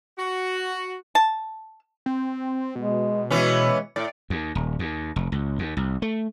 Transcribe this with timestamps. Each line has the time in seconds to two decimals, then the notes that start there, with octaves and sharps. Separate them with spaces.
0.18 F#4
1.15 A5
2.06 C4
2.75 B2 G#3
3.30 E3 G#3 B3 C#4
3.96 A2 D5
4.30 D#2
4.55 D#1
4.79 D#2
5.16 F1
5.32 C#2
5.59 D#2
5.77 C2
6.02 A3